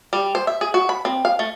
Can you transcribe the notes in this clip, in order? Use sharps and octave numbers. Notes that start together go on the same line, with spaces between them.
G3
C5
E5
G#4
F#4
B5
C4
F5
A3